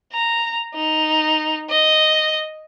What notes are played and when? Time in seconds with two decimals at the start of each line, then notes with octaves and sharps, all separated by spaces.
0.12 A#5
0.74 D#4
1.69 D#5